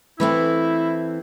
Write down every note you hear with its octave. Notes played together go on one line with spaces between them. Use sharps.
E3 A3 C4 E4